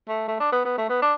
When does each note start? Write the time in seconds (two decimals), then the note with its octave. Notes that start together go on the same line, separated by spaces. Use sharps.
0.09 A3
0.28 A3
0.40 D4
0.52 B3
0.65 B3
0.78 A3
0.90 B3
1.02 D4